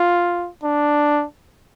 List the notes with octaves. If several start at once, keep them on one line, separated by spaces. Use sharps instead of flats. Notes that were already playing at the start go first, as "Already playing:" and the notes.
Already playing: F4
D4